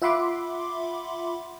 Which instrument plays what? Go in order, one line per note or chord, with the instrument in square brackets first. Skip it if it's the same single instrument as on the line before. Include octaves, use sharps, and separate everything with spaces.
[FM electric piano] F4 E5 F#5 B5 C6 D6